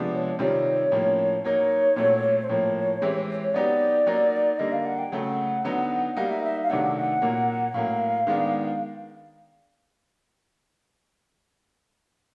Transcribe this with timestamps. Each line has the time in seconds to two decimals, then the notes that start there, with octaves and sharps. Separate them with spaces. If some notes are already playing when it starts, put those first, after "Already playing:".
Already playing: C3 F3 G#3 B3 D4
0.13 C#5
0.39 C3 D#3 G3 C4 F4 C#5
0.91 A2 F3 A#3 C#4
1.43 F#3 A#3 D#4 C#5
1.96 A#2 F#3 A3 C4
2.44 C5
2.49 A2 F3 A#3 C#5
3.02 E3 G#3 C4 E4 G4
3.43 C#5
3.54 F#3 B3 D#4 G4 D5
4.06 F#3 A#3 D#4 F#4
4.59 D3 G3 A#3 D#5
4.72 F5
4.85 F#5
4.98 G5
5.12 C#3 F#3 A3 F#5
5.64 D3 F#3 B3 D#4
6.16 G3 A#3 D#4 F#4 F5
6.30 E5
6.43 E5
6.63 F5
6.70 C3 D#3 F#3 A3 D4 F#5
6.96 F#5
7.22 A#2 F#3 A#3
7.74 A2 F#3 A#3 F5
8.27 D#3 G#3 B3 D4